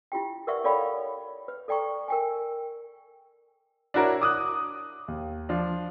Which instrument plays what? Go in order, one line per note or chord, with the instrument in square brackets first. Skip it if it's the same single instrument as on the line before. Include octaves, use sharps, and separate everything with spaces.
[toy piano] E4 F4 G4 G5
A#4 B4 D5 E5 F#5 C#6
A4 C#5 D5 F5 G5 B5
B4
A4 D5 G5 A#5 C#6
A#4 G5 G#5
[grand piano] D4 E4 F#4 A#4 C#5
D6 D#6 F#6
D#2
F3 D4